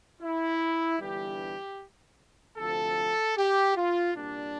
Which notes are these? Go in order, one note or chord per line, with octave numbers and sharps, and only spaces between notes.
E4
G1 G2 E3 G3 G4
D2 C3 F3 A4
G4
F4
C2 A#2 G3 D4